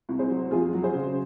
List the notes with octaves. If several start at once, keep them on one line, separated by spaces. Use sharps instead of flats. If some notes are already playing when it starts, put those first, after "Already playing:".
C2
G#4 C5
F#3
F2 F4 G#4
F#3
G#4 C5
C#3